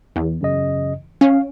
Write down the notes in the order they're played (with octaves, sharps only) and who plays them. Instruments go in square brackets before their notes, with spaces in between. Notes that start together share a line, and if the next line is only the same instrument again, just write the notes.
[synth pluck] E2
[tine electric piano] F#2 C#3 D#5
[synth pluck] C#4 [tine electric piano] F5